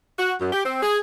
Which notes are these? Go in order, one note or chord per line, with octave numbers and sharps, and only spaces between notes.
F#4
F#2
G4
C4
G#4